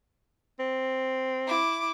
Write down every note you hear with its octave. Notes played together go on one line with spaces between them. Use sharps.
C4
E4 D6